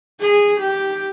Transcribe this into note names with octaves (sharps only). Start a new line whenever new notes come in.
G#4
G4